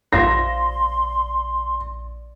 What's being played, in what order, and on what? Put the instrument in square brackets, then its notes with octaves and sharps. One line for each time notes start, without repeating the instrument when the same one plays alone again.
[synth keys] A#1 D5 [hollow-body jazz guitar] C5 E5 F5 [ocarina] C6 [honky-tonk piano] A#6